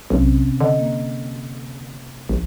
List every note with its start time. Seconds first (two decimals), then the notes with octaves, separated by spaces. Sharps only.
0.10 B1 C3 C4 C#4
0.61 D3 D#5
0.79 A#3
2.29 A#1